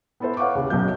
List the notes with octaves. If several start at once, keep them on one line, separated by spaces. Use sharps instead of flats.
B3 E4 A4 B4 C5 E5
C#5 F5 F#5 C#6 D6
D#2 C#3
B1 F#2 B2 F#3 G6